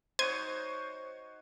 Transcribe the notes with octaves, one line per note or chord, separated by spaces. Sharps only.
D#4 F#4 C5 C#5 C6 G#6 D#7